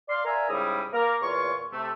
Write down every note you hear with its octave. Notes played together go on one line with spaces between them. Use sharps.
D5 F5 C6
A#4 D5 E5 F5 G#5 A#5
G#2 C#3 G3 E4 D#6
A#3 A#4
E2 A#2 F4 C#5 C#6
C3 A3